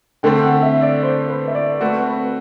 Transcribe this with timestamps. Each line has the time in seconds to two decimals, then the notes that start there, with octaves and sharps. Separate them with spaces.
0.23 D3 A3 C4 G5
0.43 F#5
0.63 E5
0.82 D5
1.03 C5
1.28 B4
1.47 E5
1.55 D5
1.81 A3 C4 F#4 B4
2.07 B4